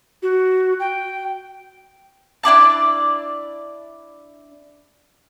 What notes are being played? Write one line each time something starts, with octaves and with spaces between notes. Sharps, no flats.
F#4
G5
D4 E4 D5 A5